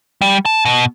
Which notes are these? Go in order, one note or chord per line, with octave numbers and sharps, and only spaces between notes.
G3
A5
B2